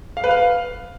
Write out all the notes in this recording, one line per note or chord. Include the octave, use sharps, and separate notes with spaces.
F5
B4
F5